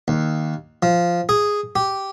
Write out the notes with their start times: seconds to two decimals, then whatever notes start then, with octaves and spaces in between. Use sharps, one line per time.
0.08 D#2
0.83 F3
1.29 G#4
1.76 G4